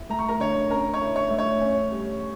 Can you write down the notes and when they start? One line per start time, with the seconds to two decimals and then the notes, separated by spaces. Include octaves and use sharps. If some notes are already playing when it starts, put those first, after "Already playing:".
Already playing: E4
0.10 A3 A#5
0.19 C#6
0.28 A#4 A#5
0.40 D3 C#5 C#6
0.70 C#4 A#4 A#5
0.94 C#5 C#6
1.01 E4
1.16 C#5 C#6
1.31 A3
1.38 C#5 C#6
1.62 C#4
1.92 G3